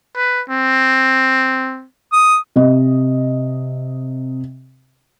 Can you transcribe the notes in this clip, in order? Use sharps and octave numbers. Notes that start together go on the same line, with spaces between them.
B4
C4
D#6
C3 D#5